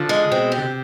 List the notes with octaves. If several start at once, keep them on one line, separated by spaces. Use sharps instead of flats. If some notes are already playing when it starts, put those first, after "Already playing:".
Already playing: D3 F3
G#3
B2 C4
G4
D3
C3